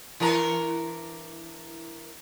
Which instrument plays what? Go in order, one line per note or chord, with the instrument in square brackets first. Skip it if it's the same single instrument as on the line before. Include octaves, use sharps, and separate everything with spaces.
[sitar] E3 D4 A#4